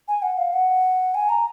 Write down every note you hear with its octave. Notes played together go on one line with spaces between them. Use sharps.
G#5
F#5
F5
F#5
G#5
A#5